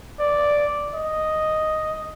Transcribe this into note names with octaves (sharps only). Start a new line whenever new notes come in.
D5
D#5